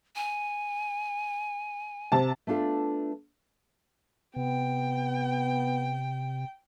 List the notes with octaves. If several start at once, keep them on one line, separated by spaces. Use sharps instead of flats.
G#5
C3 A5
A3 B3 D4 F4 A4
C3 B3 G5